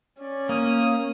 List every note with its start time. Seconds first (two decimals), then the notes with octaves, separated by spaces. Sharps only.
0.21 C#4 D5
0.49 A#3 D#6